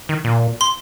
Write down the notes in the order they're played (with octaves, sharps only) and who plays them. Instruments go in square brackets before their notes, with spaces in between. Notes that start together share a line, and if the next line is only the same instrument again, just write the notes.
[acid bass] D#3
A#2
[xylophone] C6